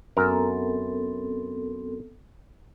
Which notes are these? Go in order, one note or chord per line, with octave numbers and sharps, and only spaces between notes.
F#2 B3 C4 A4 A#4